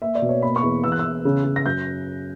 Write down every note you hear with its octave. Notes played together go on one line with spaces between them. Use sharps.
A#3 E5
D5
B2
C#5
A#3 B5
C#6
E2
E2 E6
F#6
E6
E2
C#3
C#3
A#6
F#2 G6